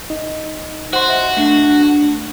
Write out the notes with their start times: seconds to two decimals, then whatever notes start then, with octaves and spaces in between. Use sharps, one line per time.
0.10 D#4 D#5
0.93 F#4 C5 F#5 C6
1.08 D#5 E5 F#5
1.37 A3 D4